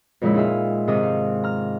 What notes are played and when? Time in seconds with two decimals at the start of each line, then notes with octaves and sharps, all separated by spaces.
0.22 F2 A#2 C#3 G#3 D#4 E4
0.34 D#4 F4 G#4 E5 F5
0.87 G#2 C3 D#3 C4 D#6
1.03 F5
1.44 A#5 F6